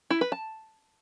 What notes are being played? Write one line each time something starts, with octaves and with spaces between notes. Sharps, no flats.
E4
B4
A5